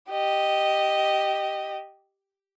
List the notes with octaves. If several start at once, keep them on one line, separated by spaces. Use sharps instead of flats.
G4 D#5